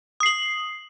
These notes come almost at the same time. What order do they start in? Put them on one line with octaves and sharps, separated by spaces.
D#6 C7 F#7